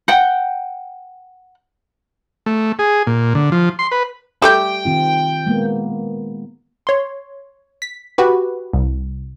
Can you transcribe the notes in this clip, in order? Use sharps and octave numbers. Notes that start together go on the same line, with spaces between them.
F#5 G5
A3
G#4
A#2
D3
F3
C6
B4
G3 A3 G4 G5
D#3 C4 F4
G#3 A#3 B3
C#5 C6
B6
F#4 G4 B4
C2